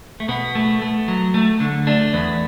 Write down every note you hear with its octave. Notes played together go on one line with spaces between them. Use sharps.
A3
B2 B3
A3
A3
F#3
A3
D3
A3 D4
E2 B3